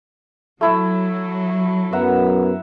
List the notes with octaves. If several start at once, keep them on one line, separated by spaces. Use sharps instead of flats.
F#3 A3 E4 E5
F#2 B3 E5 F#5 A#5